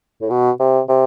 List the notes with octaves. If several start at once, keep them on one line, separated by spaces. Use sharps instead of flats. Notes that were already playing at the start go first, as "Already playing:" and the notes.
A2
B2
C3
C3